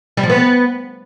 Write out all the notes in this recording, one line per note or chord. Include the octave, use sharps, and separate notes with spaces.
G3
F3
B3